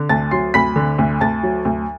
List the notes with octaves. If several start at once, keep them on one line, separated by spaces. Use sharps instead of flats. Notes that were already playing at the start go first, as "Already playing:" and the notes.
Already playing: D3
D2 A5 A6
F#3 C6 C7
D2 B5 B6
D3
D2
D2 A5 A6
F#3
D2